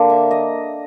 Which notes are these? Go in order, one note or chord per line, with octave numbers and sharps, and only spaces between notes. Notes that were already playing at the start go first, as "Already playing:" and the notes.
Already playing: D3 A#3
E5
D#5